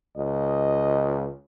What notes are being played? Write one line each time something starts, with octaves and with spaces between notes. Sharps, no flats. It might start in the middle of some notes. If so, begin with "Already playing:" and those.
C#2 D#5